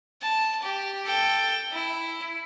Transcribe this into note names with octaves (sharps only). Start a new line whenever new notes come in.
A5
G4
A4 G5
E4